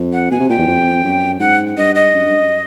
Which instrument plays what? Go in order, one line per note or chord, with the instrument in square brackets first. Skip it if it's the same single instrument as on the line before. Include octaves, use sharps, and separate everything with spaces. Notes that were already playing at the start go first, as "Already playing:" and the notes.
Already playing: [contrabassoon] F2
[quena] F#5
[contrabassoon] B2 [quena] G#5
[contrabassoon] C3
[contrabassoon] A#2 [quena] G5
[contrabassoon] E2
F2
F#2
[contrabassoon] G#2 [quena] F#5
[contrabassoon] G2 [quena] D#5
[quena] D#5
[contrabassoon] F#2
G2
F#2